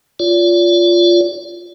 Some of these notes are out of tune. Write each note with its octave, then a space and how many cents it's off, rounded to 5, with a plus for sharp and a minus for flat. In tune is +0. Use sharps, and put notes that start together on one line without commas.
F4 +0 D5 -35